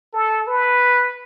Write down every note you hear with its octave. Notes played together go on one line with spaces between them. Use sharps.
A4
B4